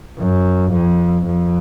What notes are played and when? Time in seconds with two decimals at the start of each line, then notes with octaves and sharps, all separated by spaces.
0.18 F#2
0.72 F2
1.26 F2